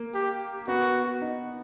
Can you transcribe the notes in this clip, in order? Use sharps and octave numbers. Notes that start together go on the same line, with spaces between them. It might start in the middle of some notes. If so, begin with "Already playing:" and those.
Already playing: A#3
G4
B3 F#4
D#4